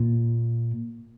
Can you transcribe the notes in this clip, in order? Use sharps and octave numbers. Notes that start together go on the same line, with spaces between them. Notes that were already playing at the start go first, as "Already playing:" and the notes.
Already playing: A#2